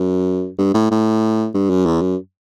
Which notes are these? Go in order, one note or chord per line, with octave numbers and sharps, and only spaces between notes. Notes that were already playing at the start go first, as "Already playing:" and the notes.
Already playing: F#2
G2
A2
A2
G2
F#2
E2
F#2